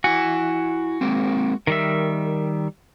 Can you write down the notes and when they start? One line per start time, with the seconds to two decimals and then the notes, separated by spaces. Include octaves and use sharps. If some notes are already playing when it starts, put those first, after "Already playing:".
0.04 E4 F#4 G#5
1.01 G#3 A#3 C4
1.67 D#3 G3 A#4 E5